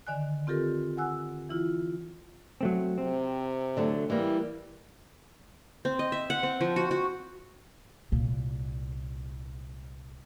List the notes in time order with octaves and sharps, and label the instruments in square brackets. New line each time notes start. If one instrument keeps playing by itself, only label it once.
[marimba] D3 D#3 D5 G#5 F#6
C4 F4 G4 A4 A#4
F#5 G#5 E6 F#6
E3 E4 F4
[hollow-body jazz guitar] F#3 A3 C4
[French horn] C3 [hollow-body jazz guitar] C4
[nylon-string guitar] D3 F#3 A3
[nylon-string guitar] E3 A#3 [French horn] G3
[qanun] C4
D#5
E5
F#5
C4
F3
F#4
F#4
[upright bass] C2 A#2